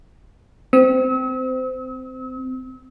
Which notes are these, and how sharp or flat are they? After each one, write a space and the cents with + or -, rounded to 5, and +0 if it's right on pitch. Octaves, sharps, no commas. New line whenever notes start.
C4 -20 E6 -45